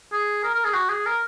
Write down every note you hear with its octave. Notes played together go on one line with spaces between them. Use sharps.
G#4
A#4
A#4
G#4
F#4
G#4
A#4